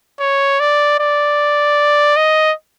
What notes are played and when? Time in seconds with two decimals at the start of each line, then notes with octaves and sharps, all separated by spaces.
0.20 C#5
0.60 D5
0.99 D5
2.16 D#5